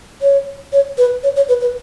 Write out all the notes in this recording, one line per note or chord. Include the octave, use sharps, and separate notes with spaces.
C#5
C#5
B4
C#5
C#5
B4
B4